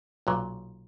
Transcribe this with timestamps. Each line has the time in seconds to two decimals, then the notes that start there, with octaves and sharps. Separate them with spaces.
0.27 B1 A#2 F#3